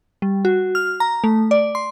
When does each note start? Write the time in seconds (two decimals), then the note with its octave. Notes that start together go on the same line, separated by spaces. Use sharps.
0.22 G3
0.45 F#4
0.75 F6
1.00 A#5
1.24 A3
1.51 D5
1.75 C6